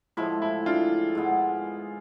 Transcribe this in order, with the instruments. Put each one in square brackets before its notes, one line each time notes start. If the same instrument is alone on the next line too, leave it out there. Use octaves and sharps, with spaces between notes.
[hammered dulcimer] A2 F3 G#3 [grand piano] E4
[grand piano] E4
D4 F4
[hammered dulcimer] G#2 G#3 B3